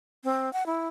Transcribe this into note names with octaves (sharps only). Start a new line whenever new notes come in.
C4
F#5
E4